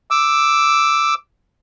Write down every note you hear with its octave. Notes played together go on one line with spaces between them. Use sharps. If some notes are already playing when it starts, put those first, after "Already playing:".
D6 E6